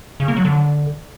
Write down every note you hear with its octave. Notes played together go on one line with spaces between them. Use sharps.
C#3
A#3
F#3
D3